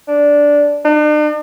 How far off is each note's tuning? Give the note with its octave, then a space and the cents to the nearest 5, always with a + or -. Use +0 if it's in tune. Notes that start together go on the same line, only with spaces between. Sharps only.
D4 -10
D4 +45